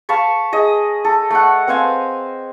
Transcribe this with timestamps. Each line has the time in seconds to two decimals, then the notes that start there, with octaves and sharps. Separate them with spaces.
0.09 F5 A5 B5 C#6
0.53 G#4 D#5
1.05 A4
1.30 A3 F#5
1.68 C4 C5 F5 G#5